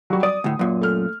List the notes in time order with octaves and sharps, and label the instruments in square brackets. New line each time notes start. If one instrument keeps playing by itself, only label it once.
[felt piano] F#3 G3 F#4
[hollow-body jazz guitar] D5 [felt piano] D#6
[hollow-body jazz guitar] D2 A2
F#2 A#2
[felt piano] A3 F6